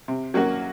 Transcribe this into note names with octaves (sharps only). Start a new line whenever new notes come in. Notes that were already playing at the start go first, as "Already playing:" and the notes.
C3
F#3 A#3 C#4 F#4